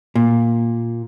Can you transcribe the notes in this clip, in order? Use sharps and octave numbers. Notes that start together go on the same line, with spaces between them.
A#2